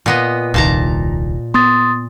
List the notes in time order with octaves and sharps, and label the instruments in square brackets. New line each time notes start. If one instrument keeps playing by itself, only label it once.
[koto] A#2 B3 D#5
[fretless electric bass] D#1 C2 D#3 [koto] A#2 A5 A#5
[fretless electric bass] B3 [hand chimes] C6 D#6 A6